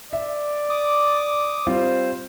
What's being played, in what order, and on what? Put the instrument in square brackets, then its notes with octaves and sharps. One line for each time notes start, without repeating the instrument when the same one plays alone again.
[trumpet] D5 [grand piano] E5
[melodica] D6 D#6
[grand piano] G3 C4 F4 [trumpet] C5